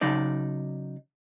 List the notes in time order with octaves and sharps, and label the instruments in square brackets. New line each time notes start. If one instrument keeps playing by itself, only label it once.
[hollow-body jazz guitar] C#3 F#3 D#4 D5